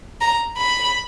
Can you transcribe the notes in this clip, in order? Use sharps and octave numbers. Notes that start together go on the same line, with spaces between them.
A#5
B5